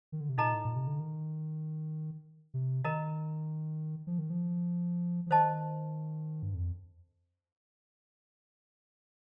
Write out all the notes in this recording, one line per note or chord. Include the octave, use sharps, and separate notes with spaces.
D#3
D3
C3
A#2 D#4 A4 D#5 A#5
A2
A#2
C3
D3
D#3
C3
D#3 A#4 D#5 A#5
F3
D#3
F3
F3
D#3 C5 D#5 A5
G2
F2